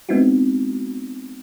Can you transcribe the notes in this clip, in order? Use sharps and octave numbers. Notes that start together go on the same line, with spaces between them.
G#3 B3 C4 D#4 E4 F#4